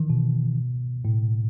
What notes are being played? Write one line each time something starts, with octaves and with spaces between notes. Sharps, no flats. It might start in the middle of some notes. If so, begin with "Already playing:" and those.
Already playing: D#3 E3
B2
A2